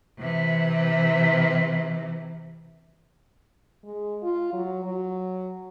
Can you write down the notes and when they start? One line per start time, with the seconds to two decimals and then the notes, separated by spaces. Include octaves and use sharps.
0.19 C3 E3
3.85 G#3
4.23 F4
4.53 F#3
4.84 F#3